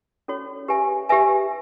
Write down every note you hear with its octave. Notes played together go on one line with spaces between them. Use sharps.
C#4 F#4 A4 C#5
G4 B4 E5 G#5
G4 B4 E5 G#5